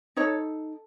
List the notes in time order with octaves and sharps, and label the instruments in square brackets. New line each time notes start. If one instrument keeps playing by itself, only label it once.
[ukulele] D#4 A4 C#5